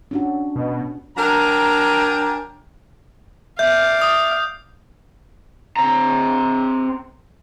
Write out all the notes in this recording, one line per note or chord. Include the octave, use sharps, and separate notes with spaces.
C#4 D4 F#4
B2
F#3 D4 A#4 G5 G#5 A#5
D5 E5 F5 G6
D#6
C4 A#5